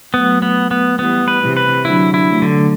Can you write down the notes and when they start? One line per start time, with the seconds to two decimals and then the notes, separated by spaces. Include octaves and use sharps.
0.14 F#3 A3 B3
0.42 B3
0.71 B3
0.99 E3 G3 B3
1.28 B4
1.42 C3 E3
1.57 B4
1.84 D3 F#3 E4
2.14 E4
2.27 F#3 A3
2.42 D3